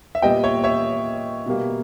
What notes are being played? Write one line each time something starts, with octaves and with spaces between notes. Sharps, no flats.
E5
A#2 G3 B3 D#5 G5
C#5 E5
C#5 E5
B2 G3 A#3